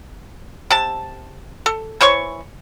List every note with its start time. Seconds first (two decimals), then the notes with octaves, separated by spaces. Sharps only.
0.70 C3 A5
1.66 A4
2.01 E3 C5 C#5 C#6